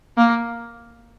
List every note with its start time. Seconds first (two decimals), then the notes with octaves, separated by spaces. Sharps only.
0.17 A#3